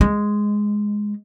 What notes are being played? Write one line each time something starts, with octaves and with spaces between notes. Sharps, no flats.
G#3